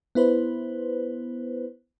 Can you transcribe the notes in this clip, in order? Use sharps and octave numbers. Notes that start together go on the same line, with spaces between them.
B3 E4 B4 C5